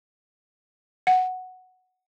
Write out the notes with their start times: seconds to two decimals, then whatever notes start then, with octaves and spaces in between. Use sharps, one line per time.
1.07 F#5